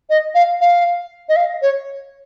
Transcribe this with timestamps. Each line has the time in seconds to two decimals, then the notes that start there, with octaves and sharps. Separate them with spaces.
0.10 D#5
0.35 F5
0.61 F5
1.29 D#5
1.36 F5
1.62 C#5